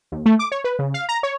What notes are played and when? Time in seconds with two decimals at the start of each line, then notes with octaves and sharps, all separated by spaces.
0.12 D#2
0.26 A3
0.39 D6
0.52 C#5
0.64 B4
0.79 C#3
0.94 F5
1.09 A#5
1.23 C#5